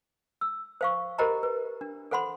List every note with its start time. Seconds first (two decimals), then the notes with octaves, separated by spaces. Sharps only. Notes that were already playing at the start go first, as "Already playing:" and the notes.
0.41 E6
0.81 C5 F5 C#6
1.18 G4 A#4 C5 D#5 A#5 B5
1.43 B4
1.81 D4
2.11 A4 C5 F#5 B5 C6